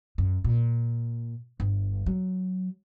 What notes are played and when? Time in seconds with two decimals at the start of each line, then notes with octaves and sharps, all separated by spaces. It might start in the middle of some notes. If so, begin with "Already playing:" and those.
0.18 F#2
0.44 A#2
1.60 G1
2.06 F#3